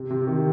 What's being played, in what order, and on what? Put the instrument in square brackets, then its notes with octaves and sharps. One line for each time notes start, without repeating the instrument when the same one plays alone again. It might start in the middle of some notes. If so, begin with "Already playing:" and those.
Already playing: [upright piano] C3
C3
D#3